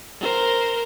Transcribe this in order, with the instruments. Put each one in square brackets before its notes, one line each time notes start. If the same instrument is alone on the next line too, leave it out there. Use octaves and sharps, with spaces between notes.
[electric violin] A#4 C5